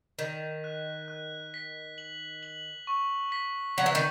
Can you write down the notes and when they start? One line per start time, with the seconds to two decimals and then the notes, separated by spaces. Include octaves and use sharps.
0.19 D#3 B6
0.64 F#6
1.08 F#6
1.54 B6
1.98 F#7
2.43 F#7
2.87 C#6
3.32 B6
3.78 F#3 B6
3.86 E3
3.95 D#3